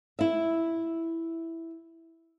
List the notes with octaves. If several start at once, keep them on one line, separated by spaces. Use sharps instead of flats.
E4 E5